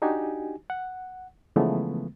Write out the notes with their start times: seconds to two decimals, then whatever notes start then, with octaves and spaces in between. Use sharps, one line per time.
0.02 D4 D#4 F#4 G4 G#5
0.70 F#5
1.56 C#3 E3 F3 G#3 A3 B3